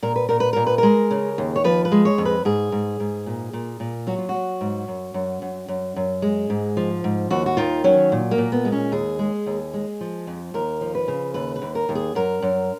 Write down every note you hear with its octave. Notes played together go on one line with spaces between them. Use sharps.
A#2 A#4
B4
A#2 A#4
B4
A#2 A#4
B4
G#3 A#4
C#3
D#2
C#5
F3 B4
B4
G#3
C#5
F2
B4
G#2 G#4
G#2
G#2
A#2
A#2
A#2
F#3 F#4
F4
F#4
F#3
G#2
F#2
F#2
F#2
F#2
F#2
G#3
G#2
F3
G#2
D#2 F#4
F#4
D#3 F4
F#3 C#4
A#2
A#3
A#2
B3
G#3
C#4
D#2 G#4
G#3
D#2
G#3
F3
F2
D#2 A#4
F3
B4
C#3
D#2 B4
B4
D#2
A#4
D#2
G#4
F#2 A#4
F#2